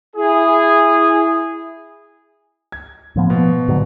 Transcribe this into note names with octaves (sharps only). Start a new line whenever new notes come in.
E4 G#4
G#6
A2 F3 B3
B2
G#2 D3 F#3